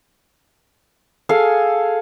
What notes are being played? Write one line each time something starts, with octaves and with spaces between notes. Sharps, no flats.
G#4 A4 F5 G#5